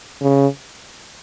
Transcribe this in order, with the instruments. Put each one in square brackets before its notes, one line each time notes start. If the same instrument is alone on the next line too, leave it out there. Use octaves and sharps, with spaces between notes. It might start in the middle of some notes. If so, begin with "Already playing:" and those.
[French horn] C#3